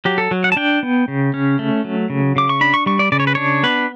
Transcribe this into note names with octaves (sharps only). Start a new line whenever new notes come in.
F#3 G4
A4
F#3
F#5
A5
D4 G5
B3
C#3
C#4
A3
F#3
C#3
C#3 D6
C#6
D4 B5
C#6
G3 C#6
D5
C#3 D5
C#5
B4
D4 C#5
B3 B4